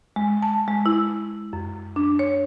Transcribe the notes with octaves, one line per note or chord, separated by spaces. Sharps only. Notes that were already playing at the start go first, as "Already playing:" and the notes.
G#3
A5
G#3
E4
F#2
D4
C#5